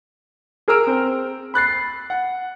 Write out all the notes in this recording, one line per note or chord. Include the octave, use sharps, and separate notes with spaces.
G#4 A#4 A#5 E6 F6 D7
C4
B5 F#6 A6 C7
F#5